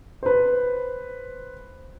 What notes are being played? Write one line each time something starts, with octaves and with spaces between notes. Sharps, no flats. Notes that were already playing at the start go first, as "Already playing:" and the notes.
B4 C5